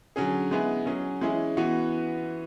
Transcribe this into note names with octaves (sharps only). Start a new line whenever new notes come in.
D3 F#3 C#4 G#4
G#3 B3 E4 G#4
F#3 C#4 G#4
E3 G#3 C#4 E4 G#4
E3 B3 F#4